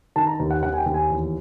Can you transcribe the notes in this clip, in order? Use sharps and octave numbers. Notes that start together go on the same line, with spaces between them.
D#3 A5
A#5
D#2
F#5
D#3 F#5
G#5
G5
D#2
G#5
E2